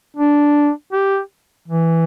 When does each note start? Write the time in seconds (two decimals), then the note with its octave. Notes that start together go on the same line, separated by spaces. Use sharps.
0.17 D4
0.93 G4
1.68 E3